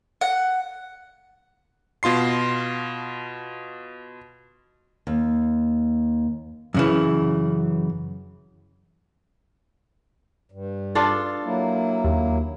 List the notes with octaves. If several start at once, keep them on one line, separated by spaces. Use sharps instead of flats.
F#5
B2 F4 C6 C7
D#2
F#2 C#3 E3
G2
D4 F4 A4
F#3 A#3 E4
D#2